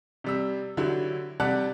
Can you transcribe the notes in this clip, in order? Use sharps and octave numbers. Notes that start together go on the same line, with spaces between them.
C3 G3 E6
D3 F#3 E4 G4
C3 G3 D5 F#5 A5 F#6